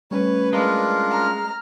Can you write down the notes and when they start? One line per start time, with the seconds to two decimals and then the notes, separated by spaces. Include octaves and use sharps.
0.11 G3 A3 C#4 B4 C#5
0.53 G#3 D4 F4 A#4
1.10 A#5 F6